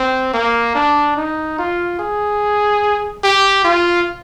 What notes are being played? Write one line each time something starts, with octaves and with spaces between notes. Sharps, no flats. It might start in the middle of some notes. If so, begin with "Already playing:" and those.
Already playing: C4
A#3
D4
D#4
F4
G#4
G4
F4